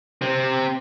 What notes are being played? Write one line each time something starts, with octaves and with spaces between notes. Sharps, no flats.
C3 C4